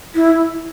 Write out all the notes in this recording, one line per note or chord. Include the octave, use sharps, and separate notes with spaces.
E4